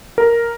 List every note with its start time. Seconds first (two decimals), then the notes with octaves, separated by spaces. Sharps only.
0.18 A#4